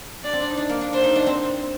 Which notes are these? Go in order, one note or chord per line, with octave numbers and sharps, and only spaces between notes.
D4 D5
C4
D4
D#4
D4
A#3
D4
D4 C5
D#4
D4
C4